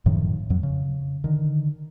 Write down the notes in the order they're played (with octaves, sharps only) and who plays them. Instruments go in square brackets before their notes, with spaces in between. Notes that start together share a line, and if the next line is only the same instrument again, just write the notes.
[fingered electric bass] F#2 A2 D#3 F3
F2 F#3
C#3
D3 D#3